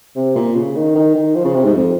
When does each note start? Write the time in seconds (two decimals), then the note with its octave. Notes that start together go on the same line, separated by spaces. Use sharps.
0.15 C3
0.35 A#2
0.55 C#3
0.75 D#3
0.95 D#3
1.15 D#3
1.35 F3
1.44 C#3
1.54 C3
1.64 G#2
1.73 F2